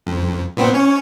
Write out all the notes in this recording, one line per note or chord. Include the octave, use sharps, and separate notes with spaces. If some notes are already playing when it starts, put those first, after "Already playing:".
F2
A#2 B3 C4
C#4 C#5